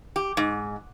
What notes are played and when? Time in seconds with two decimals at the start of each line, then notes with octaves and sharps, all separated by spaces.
0.16 G4
0.37 G#2